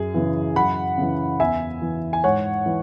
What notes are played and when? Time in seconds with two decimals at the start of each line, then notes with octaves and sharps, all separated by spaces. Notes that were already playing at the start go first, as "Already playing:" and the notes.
Already playing: F#2 G#4
0.14 C#3 E3
0.56 F#2 F#5 B5
0.98 C#3 E3
1.40 E2 E5 G#5
1.82 E3
2.13 G#5
2.24 G#2 C#5 F#5
2.66 E3